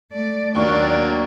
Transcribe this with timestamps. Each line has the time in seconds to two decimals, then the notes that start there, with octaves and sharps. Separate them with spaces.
0.12 A3 D5
0.55 D#2 F#3 A#3 D4 D5 C#6